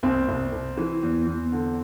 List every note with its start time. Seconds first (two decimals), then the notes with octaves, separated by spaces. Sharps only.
0.03 C2 C4
0.28 C2
0.52 C2
0.77 E3
1.03 E2
1.27 E2
1.52 D3